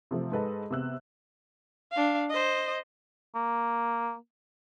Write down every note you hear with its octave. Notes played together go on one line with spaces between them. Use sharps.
C3 F3 A3
G#2 A4 B4 D#5 A5
C3 B3 E6 F#6
D4 F5
C5 D#5
A#3